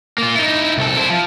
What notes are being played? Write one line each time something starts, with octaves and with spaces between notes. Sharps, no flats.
A#3 F4
D#4 E4
C2 A4
E4 C5
F3